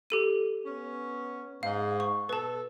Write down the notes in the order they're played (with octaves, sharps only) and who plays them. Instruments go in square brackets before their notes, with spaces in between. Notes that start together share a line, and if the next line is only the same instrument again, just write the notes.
[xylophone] G4 A4 D#7
[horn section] B3 C#4
[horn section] G#2 [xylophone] F5
[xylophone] C#6
[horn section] B2 A4 [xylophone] B4 A5